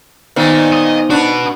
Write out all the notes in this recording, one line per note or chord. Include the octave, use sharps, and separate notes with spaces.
A#2 D#3 B3 D#4 C5
D#5
D4 F#4 B4